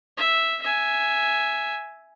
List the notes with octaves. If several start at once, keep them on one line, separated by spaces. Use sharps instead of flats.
E5
E5 G#5